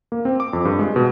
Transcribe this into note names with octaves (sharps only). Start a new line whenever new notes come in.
A#3
C4
D6
F2
G2
G#3
B2